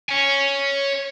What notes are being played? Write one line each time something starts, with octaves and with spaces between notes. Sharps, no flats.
C#5 G#5